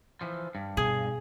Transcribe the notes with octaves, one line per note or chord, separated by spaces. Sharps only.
E3 F3
G2
B2 G#4